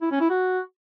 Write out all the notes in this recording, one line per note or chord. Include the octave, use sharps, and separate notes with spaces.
E4
C#4
E4
F#4